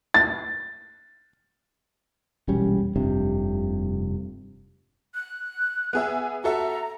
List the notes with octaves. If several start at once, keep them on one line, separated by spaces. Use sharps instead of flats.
A6
E1 A#1 G3 C#4
F1 G2 C3
F#6
B3 G#4 E5
F#4 A4 E5 A#5